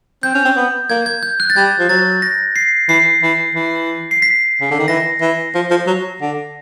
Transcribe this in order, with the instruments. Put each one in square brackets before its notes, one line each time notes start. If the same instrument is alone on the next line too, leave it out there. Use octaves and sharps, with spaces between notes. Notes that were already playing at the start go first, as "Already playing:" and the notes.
[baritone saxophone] C4 [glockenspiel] G6
[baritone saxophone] C#4
C4
B3
[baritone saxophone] A#3 [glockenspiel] G#6
[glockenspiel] G#6
G6
F#6
A6
[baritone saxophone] G3 [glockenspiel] G#6
[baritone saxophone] F3
[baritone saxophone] F#3 [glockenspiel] A6
[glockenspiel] A#6
C7
[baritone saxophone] E3 [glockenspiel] C7
[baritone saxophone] E3
E3
[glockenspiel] C7
B6
[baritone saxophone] C#3
D3
D#3
[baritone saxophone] E3 [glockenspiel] A#6
[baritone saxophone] E3
F3
F3
F#3
D3